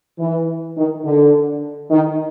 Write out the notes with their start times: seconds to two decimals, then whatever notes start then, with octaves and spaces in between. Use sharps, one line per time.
0.19 E3
0.77 D#3
1.05 D3
1.91 D#3